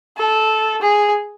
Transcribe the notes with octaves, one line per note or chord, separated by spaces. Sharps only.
A4
G#4